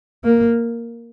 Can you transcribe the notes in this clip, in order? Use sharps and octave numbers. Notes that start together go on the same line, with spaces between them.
A#3